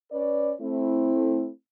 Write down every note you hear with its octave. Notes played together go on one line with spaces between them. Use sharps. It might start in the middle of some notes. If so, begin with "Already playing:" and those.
C#4 B4 C#5 D5
A3 C4 E4